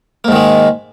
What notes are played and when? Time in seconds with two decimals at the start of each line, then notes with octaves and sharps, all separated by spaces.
0.24 A#3
0.28 G#2
0.32 D#3
0.36 G#3